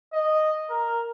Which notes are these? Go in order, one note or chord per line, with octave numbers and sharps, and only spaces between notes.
D#5
A#4